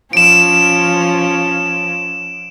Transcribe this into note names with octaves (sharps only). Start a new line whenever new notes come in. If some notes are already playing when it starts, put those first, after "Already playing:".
F3 C#4 D7 E7